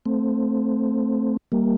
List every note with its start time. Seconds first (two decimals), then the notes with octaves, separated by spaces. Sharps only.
0.06 A3 C4
1.52 G3 A#3